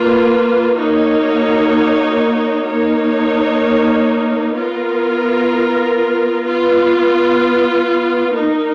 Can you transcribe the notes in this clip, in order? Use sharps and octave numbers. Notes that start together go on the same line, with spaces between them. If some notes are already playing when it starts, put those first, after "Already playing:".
Already playing: A#3 F4 B4
A#3 D#4 F#4 C#5
A#3 D#4 A#4 C#5
B3 F4 A#4
B3 F4 B4
A#3 D#4 A#4